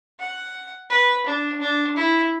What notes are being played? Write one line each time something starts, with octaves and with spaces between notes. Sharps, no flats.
F#5
B4
D4
D4
E4